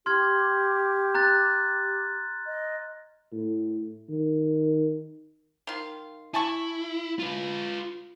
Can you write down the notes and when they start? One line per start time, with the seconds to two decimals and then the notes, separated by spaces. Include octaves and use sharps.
0.06 G4 C6 F6 G#6
1.15 A#5 F#6 A6
2.46 D#5
3.32 A2
4.09 D#3
5.67 D#3 F4
6.34 E4 G#5 A5 C#6
7.19 F4 B4